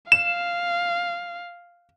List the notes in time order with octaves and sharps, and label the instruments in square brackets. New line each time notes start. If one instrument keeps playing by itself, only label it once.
[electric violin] F5 [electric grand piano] E7